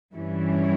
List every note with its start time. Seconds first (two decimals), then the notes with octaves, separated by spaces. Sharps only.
0.14 G2 E3 G3 C#4 E4